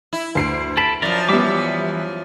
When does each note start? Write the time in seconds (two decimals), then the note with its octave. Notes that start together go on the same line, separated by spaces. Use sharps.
0.13 E4
0.35 D2 C7 D7
0.77 A4 A5 B5 D7
1.02 F#2 C#3 F3 A#4 D5
1.29 E3 G3 B3 E5 D6